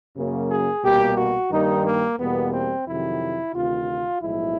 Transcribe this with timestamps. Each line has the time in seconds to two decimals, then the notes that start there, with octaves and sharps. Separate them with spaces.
0.16 F#2 C#3 F#3 A#3
0.50 G#4
0.82 C2 B2 G3 A#3 G4
1.16 F#4
1.50 G2 D#3 G3 A#3 D#4
1.84 A#3
2.18 E2 B2 G3 A#3 B3
2.52 C4
2.85 F2 C3 D#3 F#3 E4
3.53 D2 C3 D#3 F4
4.20 B1 A2 F3 G#3 E4